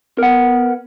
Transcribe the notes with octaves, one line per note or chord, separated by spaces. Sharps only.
B3 A#4 F#5